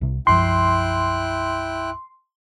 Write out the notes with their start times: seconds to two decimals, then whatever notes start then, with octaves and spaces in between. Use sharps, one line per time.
0.01 C2 C3
0.27 B1 F#2 F3 E4 G5 C6 F#6